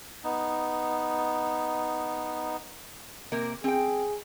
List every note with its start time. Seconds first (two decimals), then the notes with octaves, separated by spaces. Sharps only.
0.24 B3 D#4
3.32 C3 A#3 A#4
3.64 C4 G#4 G5